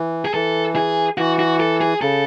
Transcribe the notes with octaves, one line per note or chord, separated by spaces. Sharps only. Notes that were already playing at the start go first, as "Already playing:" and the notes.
Already playing: E3
G#4
E3 A4
G#4
E3 F#4
F#4
A4
G#4
C#3 A4